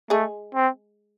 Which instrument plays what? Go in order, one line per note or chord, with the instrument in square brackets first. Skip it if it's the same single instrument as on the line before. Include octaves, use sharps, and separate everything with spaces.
[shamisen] G#3 G#4 [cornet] A3
[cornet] C4